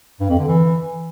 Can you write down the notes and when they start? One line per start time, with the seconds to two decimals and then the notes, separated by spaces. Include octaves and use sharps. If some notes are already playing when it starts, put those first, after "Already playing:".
0.20 G2
0.29 F2
0.39 D3
0.48 E3